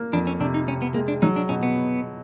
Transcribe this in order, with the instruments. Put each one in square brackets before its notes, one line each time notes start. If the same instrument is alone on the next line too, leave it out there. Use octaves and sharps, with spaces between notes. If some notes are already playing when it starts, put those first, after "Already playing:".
Already playing: [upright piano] A#3
[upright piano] F2 [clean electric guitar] D4
[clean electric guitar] C#4
[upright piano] C3 [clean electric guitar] D4
[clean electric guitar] D#4
[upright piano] C3 [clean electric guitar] C#4
[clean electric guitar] B3
[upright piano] G#3 [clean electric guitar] A#3
[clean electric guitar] D4
[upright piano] F#3 [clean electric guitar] D#4
[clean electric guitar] D4
[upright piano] B2 [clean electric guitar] C#4
[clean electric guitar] B3